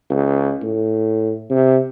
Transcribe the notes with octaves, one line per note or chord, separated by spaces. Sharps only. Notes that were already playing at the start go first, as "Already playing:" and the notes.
C#2
A2
C3